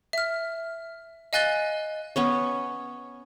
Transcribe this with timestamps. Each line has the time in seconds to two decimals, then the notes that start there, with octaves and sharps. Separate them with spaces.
0.13 E5 F6
1.33 D#5 F5 G#5 F#6 A6 G7
2.16 B3 C#4 C#5